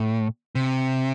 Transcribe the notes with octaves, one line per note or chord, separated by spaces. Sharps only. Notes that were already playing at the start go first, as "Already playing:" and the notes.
Already playing: A2
C3